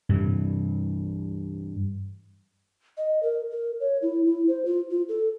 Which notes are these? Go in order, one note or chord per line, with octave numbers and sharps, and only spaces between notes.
G2 C3 E3
D#5
A#4
A#4
C#5
E4
E4
C5
F4
F4
A4